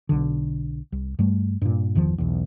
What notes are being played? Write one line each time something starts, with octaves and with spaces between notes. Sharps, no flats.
B1 D3
C2
G2 G3 A3
G2 A#2
G1 E2 D#3 F3
B1 E2